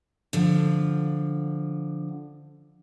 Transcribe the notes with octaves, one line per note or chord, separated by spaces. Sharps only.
D3 F3